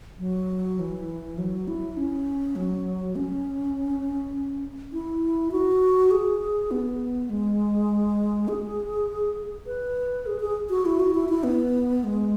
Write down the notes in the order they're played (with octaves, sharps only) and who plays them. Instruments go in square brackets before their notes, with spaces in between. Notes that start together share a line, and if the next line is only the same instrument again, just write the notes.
[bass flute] F#3
E3
F#3
E4
C#4
F#3
C#4
E4
F#4
G#4
B3
G#3
G#4
B4
G#4
G#4
F#4
E4
F#4
E4
E4
B3
G#3